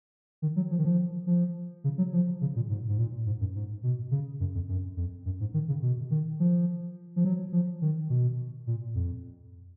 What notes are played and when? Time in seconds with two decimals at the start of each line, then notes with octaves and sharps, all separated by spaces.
0.42 D#3
0.56 F#3
0.71 F3
0.78 D#3
0.85 F3
1.27 F3
1.84 C#3
1.98 F#3
2.13 F3
2.41 C#3
2.56 A#2
2.69 G#2
2.89 G#2
2.98 A#2
3.26 G#2
3.40 F#2
3.55 G#2
3.83 B2
4.11 C#3
4.40 F#2
4.55 F2
4.68 F#2
4.97 F2
5.25 F#2
5.40 G#2
5.54 D#3
5.68 C#3
5.82 B2
6.11 D#3
6.40 F3
7.16 F3
7.25 F#3
7.52 F3
7.82 D#3
8.10 B2
8.67 A#2
8.95 F2